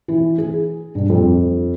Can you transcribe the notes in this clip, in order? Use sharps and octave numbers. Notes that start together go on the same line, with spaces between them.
E3
G#4
G2
F2